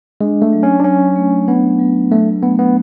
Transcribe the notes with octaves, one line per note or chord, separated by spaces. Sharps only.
G#3 D4
A3
F#3
C#4
D4
F#3 C#4
A3
B3 D4
F#3
F#3 A3
A3 B3
B3